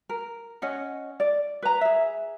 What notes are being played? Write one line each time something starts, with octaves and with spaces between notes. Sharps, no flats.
A#4
C#4 D#5 F#5
D5
B4 A#5
G#4 E5